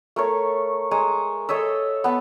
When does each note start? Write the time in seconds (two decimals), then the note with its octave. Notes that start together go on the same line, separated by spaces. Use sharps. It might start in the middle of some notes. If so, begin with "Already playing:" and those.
0.16 A3 A#4 C#5
0.91 G#3 G#5 A#5 C#6
1.49 A4 C#5 D#5 E5
2.04 B3 A5